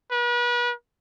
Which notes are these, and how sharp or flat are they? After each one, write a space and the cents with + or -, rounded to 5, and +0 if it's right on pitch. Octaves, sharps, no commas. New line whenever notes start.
B4 -40